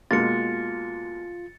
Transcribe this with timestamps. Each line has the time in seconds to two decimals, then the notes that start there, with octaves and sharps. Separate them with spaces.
0.11 B2 G#3 A#3 F4 A6 C#7